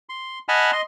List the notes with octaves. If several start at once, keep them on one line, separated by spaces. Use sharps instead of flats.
C6
D#5 F#5 G#5 A5 B5 F6
D#5 C6